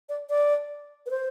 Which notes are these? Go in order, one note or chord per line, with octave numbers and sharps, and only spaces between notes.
D5
D5
B4
C5